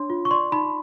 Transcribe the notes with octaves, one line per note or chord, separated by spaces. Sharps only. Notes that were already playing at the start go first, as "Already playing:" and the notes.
Already playing: D4 C#5 C6
F4
C#6
D5 C6
D#4 B5